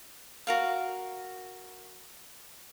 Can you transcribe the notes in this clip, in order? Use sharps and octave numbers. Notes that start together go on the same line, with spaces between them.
F#4 A#4 F5